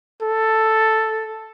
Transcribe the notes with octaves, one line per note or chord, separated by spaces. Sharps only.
A4